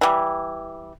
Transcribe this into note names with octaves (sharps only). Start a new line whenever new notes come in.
E3 G3